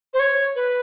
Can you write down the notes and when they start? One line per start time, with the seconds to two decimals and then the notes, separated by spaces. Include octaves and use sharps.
0.14 C5
0.19 C#5
0.56 B4